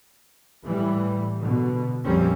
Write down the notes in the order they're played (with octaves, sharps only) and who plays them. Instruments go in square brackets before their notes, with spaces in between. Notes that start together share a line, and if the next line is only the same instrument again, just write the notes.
[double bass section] A2 E3 G3
B2 D3
A#1 F2 G3 A#3 C4 C#4